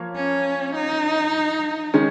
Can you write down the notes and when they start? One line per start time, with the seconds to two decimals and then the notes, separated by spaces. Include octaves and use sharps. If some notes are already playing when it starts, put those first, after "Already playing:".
Already playing: F3 A#3 C#5
0.15 C#4
0.75 D#4
1.94 D#3 G#3 C#4